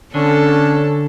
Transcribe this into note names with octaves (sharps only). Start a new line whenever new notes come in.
D3 C#4 D4 A4